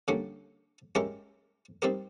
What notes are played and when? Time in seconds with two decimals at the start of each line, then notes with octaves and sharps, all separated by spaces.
0.08 D3 G3 A#3 C#4
0.95 G#3 C#4 E4 G4 A#4
1.82 G3 C4 D#4 G4 A#4